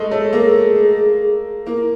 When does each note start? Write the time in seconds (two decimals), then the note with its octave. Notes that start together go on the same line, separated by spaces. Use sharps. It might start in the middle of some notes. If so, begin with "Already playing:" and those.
Already playing: G#3 A3
0.11 A3 C#5
0.33 A#3 G#4
1.67 A#3 E4